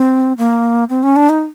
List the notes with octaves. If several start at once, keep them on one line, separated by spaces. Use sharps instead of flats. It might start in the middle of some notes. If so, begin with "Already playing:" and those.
Already playing: C4
A#3
C4
C#4
D4
D#4